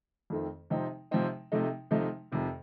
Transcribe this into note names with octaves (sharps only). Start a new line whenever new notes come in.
F2 D#3 A3 C4
C3 F3 C4 D#4
C3 F3 C4 D#4
C3 F3 A3 D#4
C3 F3 A3 D#4
F2 C3 D#3